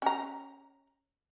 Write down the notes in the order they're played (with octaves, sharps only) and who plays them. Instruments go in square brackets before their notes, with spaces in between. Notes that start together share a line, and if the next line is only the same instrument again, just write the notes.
[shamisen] C#4 A#5